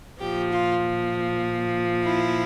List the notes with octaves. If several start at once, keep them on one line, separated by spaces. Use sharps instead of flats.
A#2 F3 G4
F4
E4